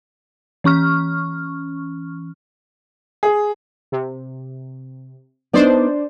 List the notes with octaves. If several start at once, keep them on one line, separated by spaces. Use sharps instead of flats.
E3 C#4 C#6 F6
G#4
C3
B3 D4 D#4 C5 D5